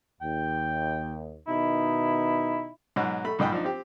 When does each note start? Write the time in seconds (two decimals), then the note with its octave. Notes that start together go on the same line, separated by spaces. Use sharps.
0.21 D#2 G5
1.48 B2 D#3 D#4 E4
2.96 G#2 B2 F#3
3.25 A3 B5
3.39 A#1 G#2 D#5 G5 B5
3.52 F3 D4 D#4
3.64 C4 G4